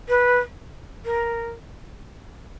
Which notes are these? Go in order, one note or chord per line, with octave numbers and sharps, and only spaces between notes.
B4
A#4